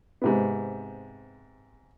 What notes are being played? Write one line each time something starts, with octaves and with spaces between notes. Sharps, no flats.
G#2 C3 B3